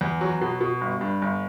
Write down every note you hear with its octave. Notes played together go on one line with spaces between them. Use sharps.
E2
F#3
B2
B2
G1
G2
G1